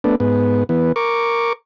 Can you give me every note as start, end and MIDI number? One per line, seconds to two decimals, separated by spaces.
0.04 0.15 57
0.04 0.15 59
0.04 0.15 62
0.20 0.64 44
0.20 0.64 59
0.69 0.92 52
0.69 0.92 59
0.96 1.53 70
0.96 1.53 85
0.96 1.53 86